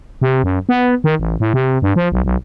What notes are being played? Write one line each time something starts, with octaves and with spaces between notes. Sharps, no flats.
C3
F#2
B3
D#3
A1
A2
C3
G2
F3
B1
B1